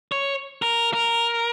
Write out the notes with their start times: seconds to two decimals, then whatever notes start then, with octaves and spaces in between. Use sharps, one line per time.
0.12 C#5
0.62 A#4
0.93 A#4